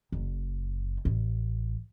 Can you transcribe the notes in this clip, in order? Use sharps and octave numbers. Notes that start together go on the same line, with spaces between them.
F#1
A1